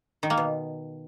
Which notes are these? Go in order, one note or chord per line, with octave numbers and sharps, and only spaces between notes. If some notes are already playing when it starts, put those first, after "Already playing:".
D#3
A#3
B2